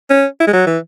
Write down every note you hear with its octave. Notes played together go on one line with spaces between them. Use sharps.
C#4
E4
G#3
F#3
E3